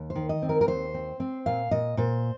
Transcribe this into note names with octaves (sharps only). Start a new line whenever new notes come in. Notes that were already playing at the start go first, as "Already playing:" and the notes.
Already playing: D#2
C5
D#3
D#5
C4
A#4
A#4
D#2 C5
C4
C4
A#2 F5
A#2 D#5
A#2 C5